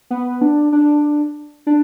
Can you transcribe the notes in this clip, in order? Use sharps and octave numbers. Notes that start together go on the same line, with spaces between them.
B3
D4
D4
D4